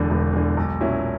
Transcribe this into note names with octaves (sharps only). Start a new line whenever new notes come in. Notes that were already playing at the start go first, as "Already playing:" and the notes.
Already playing: E1 E2 D3
E1
E2 D3
B1
A#2 F#3 C#4 E4